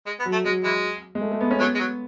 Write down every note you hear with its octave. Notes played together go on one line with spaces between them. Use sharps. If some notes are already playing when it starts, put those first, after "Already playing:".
G#3
B3
F#3
A3
F#3 G#3
E3 G#3
G#3
A3
A3
B3
C#4
F#3 B3
G#3
F#3